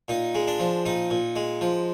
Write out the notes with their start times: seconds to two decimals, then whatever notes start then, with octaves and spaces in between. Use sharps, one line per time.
0.08 A#2 D#4
0.35 G#3
0.47 D4
0.60 F3
0.86 A#2 D#4
1.10 A#2
1.36 G#3
1.61 F3